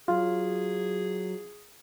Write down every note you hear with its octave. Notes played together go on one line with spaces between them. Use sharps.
F#3 F4 G#4